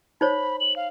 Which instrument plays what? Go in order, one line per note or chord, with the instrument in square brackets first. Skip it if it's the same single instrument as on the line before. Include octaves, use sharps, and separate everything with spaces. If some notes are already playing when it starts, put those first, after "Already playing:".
[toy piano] D#4 C5 C#5 [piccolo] B5
[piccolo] F#7
F5